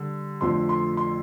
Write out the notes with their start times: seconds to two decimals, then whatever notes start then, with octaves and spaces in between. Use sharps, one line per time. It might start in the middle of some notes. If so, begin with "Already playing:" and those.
Already playing: D3 G3
0.41 F2 D3 F3 A3 C4 C6
0.69 C6
0.97 C6